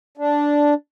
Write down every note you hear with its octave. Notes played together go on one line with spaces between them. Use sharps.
D4